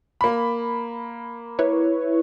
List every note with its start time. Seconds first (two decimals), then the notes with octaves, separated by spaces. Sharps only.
0.21 A#3 B5
1.59 E4 B4 C#5